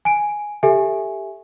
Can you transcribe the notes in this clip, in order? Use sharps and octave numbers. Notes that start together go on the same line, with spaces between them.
G#5 D7
G4 A4 E5 G#5